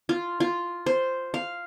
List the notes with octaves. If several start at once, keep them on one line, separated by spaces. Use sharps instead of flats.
F4
F4
C5
F5